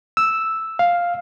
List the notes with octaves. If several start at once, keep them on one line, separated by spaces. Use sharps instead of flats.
E6
F5